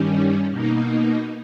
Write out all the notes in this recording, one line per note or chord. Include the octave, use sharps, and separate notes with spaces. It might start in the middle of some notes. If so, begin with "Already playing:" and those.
Already playing: G2 D#3 G3 C#4
B2 A#3 D#4